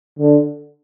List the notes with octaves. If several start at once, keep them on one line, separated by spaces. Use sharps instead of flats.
D3